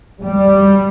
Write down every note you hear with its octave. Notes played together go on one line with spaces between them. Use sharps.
G3